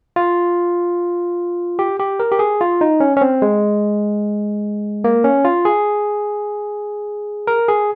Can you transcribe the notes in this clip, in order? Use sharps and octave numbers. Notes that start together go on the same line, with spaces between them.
F4
G4
G4
A#4
G4
G#4
F4
D#4
C#4
C#4
C4
G#3
A#3
C#4
F4
G#4
A#4
G#4